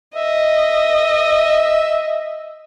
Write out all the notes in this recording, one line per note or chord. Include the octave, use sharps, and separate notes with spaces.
D#5 E5